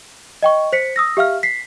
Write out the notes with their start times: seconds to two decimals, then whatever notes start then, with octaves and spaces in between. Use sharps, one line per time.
0.43 D#5 G5 C#6
0.73 C5 B6 C#7
0.96 D#6 E6 A#6
1.17 G4 E5 F5 F6
1.43 B6 C7